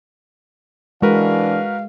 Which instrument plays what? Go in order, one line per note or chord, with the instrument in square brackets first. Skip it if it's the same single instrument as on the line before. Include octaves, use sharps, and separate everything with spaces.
[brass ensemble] E3 D4 [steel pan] G#3 [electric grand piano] F#4 A#4 B4 [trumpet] F5